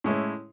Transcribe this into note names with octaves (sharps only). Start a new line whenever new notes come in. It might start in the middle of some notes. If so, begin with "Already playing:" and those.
A2 G#3 C#4 E4